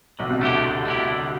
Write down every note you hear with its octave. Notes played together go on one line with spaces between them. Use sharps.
B1 B2 D3
C2 C3
D2 D3 A3 E4 G4
D3
A3 E4 G4
D3